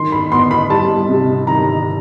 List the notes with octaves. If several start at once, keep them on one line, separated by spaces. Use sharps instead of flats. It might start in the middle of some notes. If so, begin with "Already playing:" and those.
Already playing: D#3 C6
B5
B3 C6
B5
G3 A5
C3
D#3 A#5